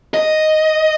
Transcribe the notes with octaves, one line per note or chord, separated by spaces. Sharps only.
D#5